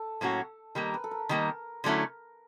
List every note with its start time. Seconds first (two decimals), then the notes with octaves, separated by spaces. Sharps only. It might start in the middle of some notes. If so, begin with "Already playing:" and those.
Already playing: A4
0.21 A2 F#3 A#3 C#4 F#4
0.75 D#3 G3 A#3 A#4
0.94 B4
1.04 A4
1.11 A#4
1.29 D#3 G3 A#3 A#4
1.84 D3 F#3 A3 C#4 E4